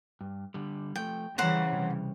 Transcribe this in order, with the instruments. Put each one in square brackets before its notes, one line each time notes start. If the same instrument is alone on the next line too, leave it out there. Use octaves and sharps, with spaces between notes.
[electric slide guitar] G2
D3 G3
[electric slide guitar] F3 A3 [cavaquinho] G5
[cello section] C#3 E3 [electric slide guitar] G3 C#5 [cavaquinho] C5 F#5 A#5
[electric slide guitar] C3 G3